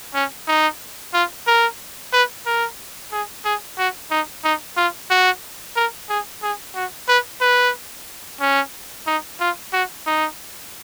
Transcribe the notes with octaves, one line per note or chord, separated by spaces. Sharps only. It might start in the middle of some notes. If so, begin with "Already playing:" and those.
C#4
D#4
F4
A#4
B4
A#4
G#4
G#4
F#4
D#4
D#4
F4
F#4
A#4
G#4
G#4
F#4
B4
B4
C#4
D#4
F4
F#4
D#4